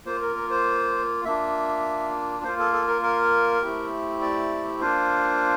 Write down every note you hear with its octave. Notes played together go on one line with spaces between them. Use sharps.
A#3 F4 C5
A#4
A#4
C5
A#3 D4 F4 E5
A#3 F4 C5
A4
A4
A#4
A#4
A3 C4 E4 G4
D5
A#3 D4 F4 C5